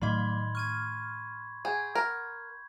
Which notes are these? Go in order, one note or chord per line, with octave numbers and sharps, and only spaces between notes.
A2 D#3 F#3 A3 D#5 B5 C6 G#6
C#6 F6 G#6 D#7
G#4 F#5 G6 G#6
A#4